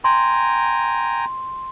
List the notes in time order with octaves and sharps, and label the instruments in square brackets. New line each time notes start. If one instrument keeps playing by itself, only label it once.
[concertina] G5 G#5 A#5 [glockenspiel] C6